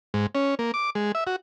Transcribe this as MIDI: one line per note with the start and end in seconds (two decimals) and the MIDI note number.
0.14 0.26 44
0.35 0.55 61
0.59 0.71 58
0.74 0.90 86
0.95 1.12 56
1.15 1.24 76
1.27 1.36 66